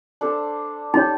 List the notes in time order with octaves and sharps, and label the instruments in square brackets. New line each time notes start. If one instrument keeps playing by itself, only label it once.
[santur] D4 A4 C5
[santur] G3 [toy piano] D#4 C#5